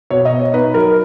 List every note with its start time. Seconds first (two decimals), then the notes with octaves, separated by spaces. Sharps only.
0.10 B2 C#5
0.25 D#5
0.32 B3
0.39 C#5
0.53 D#4 B4
0.74 F#3 A#4